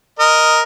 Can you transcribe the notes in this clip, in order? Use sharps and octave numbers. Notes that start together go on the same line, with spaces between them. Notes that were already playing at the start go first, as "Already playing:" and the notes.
A#4 D#5